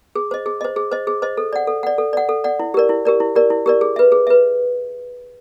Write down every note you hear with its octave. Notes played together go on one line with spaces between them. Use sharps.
G#4
C5 D#5
G#4
C5 D#5
G#4
C5 D#5
G#4
C5 D#5
A4
D5 F#5
A4
D5 F#5
A4
D5 F#5
A4
D5 F#5
E4
G4 A#4 D5
E4
G4 A#4 D5
E4
G4 A#4 D5
E4
G4 A#4 D5
G#4
B4 E5
G#4
B4 E5